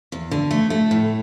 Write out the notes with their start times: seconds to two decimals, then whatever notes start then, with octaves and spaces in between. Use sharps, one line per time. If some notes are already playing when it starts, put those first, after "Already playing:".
0.12 E2
0.31 D3
0.51 A3
0.70 A3
0.91 A2